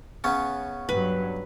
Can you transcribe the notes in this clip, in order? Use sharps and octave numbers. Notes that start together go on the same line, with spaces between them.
C#3 B3 C#4
G2 F#3 B4